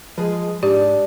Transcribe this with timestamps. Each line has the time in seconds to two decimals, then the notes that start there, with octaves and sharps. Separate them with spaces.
0.18 F3 G#3 G#4 B4
0.63 G#2 D4 G4 D5